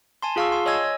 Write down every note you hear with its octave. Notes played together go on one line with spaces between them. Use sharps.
G#5 A5 C6
F4 G#4 F5 A5 C#6 E6
C6
C#5 D#5 G#5 E6 G#6
C#5